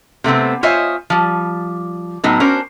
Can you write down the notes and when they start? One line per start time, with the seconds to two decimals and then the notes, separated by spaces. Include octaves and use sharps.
0.24 C3 A3 B3 C4
0.63 F4 C5 C#5 D#5 E5 G#5
1.10 F3 G3
2.24 A2 F#3 B3 D#4
2.40 C#4 D4 F#4 A#4 C5